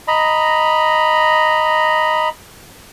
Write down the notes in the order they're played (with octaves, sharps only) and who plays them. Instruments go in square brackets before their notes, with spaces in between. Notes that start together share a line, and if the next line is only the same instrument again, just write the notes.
[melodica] D#5 A#5 B5